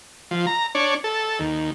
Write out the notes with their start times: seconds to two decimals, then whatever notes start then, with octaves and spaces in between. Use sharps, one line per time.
0.31 F3
0.47 A#5
0.75 D4 C#5
1.04 A4
1.40 D#2